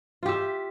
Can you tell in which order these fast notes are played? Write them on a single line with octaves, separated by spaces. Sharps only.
F4 G4 E5